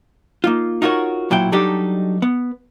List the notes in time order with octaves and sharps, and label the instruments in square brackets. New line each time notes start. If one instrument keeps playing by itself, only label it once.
[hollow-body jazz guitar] A#3 D#4 F4
D#4 F4 F#4 A#4 C#5
B1 A#2 F#3 E4 G5
F#3 G3 D4 D#4 G4 A4
B3